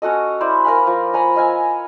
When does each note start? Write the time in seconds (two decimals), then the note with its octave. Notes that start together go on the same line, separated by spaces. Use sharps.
0.02 C#4 F#4 A4 D#5
0.41 E4 C5 D5
0.64 A#4 F5 G#5 B5
0.87 F3
1.13 C#5 G#5 A#5 B5
1.36 D#5 F5 G#5 E6